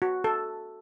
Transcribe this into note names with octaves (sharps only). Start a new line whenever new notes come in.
F#4
A4